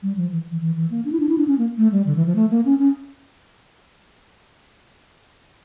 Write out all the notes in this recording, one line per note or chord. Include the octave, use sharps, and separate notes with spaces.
G3
F3
E3
E3
E3
E3
A#3
D4
E4
D4
E4
D4
C#4
A#3
A3
G3
D3
E3
F3
A3
A#3
C#4
C#4